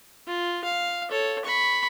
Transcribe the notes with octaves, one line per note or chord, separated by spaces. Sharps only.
F4
F5
A4 C#5
B5 C#6